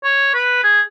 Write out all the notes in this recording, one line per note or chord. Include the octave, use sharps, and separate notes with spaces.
C#5
B4
G#4